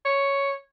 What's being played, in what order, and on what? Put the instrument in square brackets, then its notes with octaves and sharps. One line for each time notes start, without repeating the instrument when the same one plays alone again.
[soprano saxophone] C#5